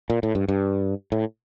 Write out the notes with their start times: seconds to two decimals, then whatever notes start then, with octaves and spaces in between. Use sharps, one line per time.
0.10 A#2
0.23 A2
0.35 G2
0.48 G2
1.12 A2